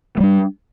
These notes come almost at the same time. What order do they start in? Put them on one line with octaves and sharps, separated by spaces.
A3 G3 D4